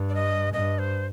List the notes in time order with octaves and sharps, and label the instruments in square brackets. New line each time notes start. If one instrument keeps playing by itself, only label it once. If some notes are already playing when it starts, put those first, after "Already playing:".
Already playing: [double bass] G2
[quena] D5
D#5
[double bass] G2 [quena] D#5
[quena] C5